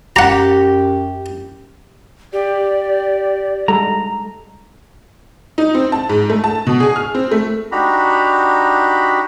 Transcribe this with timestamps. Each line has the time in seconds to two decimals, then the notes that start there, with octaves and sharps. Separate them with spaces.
0.16 F#2 G4 F#5 A#5
2.33 G4 D5
3.68 G3 G#3 A4 A#5
5.58 D#4
5.75 C4
5.92 A5
6.09 G#2
6.30 A3
6.44 A5
6.67 B2
6.80 G#4
6.96 F6
7.15 C4
7.31 A3
7.72 D4 D#4 F#4 G4 A#5 B5